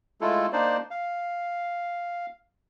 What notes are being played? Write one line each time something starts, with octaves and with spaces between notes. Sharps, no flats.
G#3 A3 E4 F4 A4
A#3 D4 D#4 C5 D5
F5